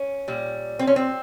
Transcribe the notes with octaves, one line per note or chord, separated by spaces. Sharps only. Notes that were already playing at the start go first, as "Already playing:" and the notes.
Already playing: C#4
A#2 G3
C4
C#4
C4